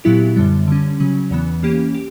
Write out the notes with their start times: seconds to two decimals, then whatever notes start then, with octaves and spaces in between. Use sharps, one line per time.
0.04 A#2 F#3 B3 E4 G4
0.36 F#2 D3 G3 B3
0.68 D3 G3 C#4
1.00 C#3 F#3 C#4
1.31 E2 C#3 E3 B3
1.62 E3 A#3 C#4 G4
1.94 G4